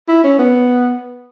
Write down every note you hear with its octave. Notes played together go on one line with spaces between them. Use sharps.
E4
C#4
B3